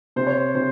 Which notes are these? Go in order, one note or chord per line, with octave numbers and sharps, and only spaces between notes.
C3 C5
C#5
C5
C3 C5